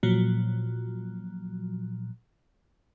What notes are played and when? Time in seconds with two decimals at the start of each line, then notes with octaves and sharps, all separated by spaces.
0.03 A#2 F3 F#3